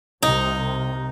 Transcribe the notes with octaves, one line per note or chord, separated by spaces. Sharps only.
C2 C3 D#4